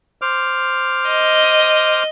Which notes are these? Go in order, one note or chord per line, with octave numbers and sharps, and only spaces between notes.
C5 D6 F6
D#5